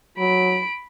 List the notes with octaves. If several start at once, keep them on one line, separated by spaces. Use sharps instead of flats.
F#3 B5 D7